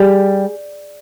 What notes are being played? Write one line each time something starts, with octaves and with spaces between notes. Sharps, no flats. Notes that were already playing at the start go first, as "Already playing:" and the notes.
Already playing: G3 G#4